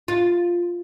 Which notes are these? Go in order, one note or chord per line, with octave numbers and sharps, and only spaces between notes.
F4